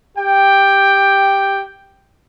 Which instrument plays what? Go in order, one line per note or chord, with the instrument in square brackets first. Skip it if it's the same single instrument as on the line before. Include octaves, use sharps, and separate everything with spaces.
[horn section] G4 G5